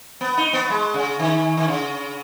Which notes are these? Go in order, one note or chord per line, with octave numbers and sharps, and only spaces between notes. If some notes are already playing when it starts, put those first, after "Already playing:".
B3
D#4
B3
G#3
C#3
D#3
D#3
C#3